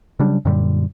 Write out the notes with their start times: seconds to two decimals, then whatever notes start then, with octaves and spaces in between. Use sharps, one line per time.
0.19 C#3 F#3 G3 D4
0.45 F#2 A#2 D3 G3